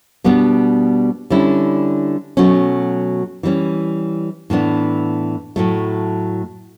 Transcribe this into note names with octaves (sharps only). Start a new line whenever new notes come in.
B2 G3 B3 D4
D3 G3 C#4 E4
B2 F#3 A3 C#4
E3 G3 C#4
A2 E3 B3 D4
A2 F#3 A3